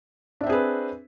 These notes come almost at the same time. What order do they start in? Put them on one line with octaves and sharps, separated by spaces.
D4 E5 C4 G#4 B4